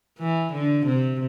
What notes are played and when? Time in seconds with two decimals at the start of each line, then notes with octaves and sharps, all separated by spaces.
0.19 E3
0.53 D3
0.86 C3